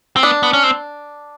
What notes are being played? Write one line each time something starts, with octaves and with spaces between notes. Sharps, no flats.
C4
B3 D4
B3
C#4
C4